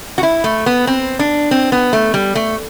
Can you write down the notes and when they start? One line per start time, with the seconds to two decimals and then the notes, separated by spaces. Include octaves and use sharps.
0.18 F#4
0.23 E4
0.44 A3
0.66 B3
0.87 C4
1.19 D4
1.51 C4
1.72 B3
1.93 A3
2.14 G3
2.35 A3